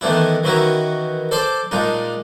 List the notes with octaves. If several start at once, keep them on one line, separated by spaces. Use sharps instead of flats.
D#3 E3 A3 B3 D4 E4
D#3 E3 C#4 E4 F#4 A#4
A4 C5 D5 C6 D6
A#2 G#3 D4 D#4